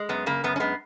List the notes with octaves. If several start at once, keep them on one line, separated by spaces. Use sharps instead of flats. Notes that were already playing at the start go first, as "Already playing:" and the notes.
Already playing: G#3
F#2 B3
C#3 A#3
F#2 B3
C#4
G#3 B3